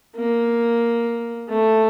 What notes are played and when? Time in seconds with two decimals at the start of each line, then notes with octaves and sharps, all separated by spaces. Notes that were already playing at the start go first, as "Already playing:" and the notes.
0.15 A#3
1.49 A3